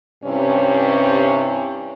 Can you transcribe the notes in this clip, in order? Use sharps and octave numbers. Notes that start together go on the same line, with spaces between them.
G2 C3 C4 C#4 E4